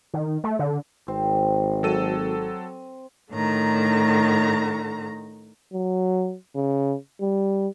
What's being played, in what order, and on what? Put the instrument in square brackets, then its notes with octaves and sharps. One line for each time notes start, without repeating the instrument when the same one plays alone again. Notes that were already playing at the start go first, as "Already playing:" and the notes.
[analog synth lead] D#3
A3
D3
[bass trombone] G#1 [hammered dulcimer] C4
[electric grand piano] F#3 A4 D#7
[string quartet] A2 D3 D#3 A#5
[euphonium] F#3
C#3
G3